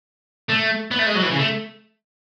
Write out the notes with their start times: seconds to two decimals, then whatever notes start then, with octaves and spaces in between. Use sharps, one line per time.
0.50 A3
0.91 B3
0.99 A3
1.07 G#3
1.15 F#3
1.23 E3
1.31 C#3
1.39 A3